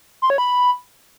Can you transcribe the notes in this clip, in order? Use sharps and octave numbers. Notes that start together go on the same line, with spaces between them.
C6
C#5
B5